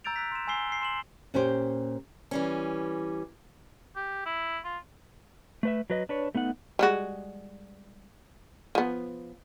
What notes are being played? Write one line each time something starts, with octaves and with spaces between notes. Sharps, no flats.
A#5 E6 G6 A6 D7 F7
E6 F#6 B6
C6 E7
G#5 C6 E6 C7 G7
E6 C7
C6 E7 F#7
A#2 C#4 G4 C5
E3 G3 C#4
G4
E4
F4
A3 B4 E5
F#3 B4 D#5
D4 B4 C#5
A3 B3 D#4 F#5
G3 G#3 F#4
F3 B3